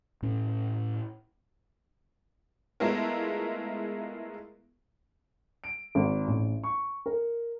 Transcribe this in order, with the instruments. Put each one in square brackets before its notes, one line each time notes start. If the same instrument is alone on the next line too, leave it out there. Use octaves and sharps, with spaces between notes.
[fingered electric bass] A2 C#4
[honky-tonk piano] G#3 A3 B3 E4 F4 A#4
[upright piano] D7
G#1
A1
C#6
A#4